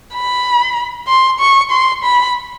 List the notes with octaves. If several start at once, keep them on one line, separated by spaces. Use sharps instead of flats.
B5
C6
C#6
C6
B5